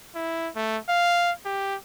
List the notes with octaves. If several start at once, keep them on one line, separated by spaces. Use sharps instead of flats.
E4
A3
F5
G4